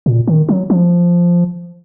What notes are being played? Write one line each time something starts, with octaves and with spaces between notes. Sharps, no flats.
A#2
D#3
F#3
F3